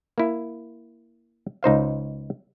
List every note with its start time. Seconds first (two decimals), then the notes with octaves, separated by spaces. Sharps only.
0.18 A#3 E4
1.63 C#2 D#4 C5 F5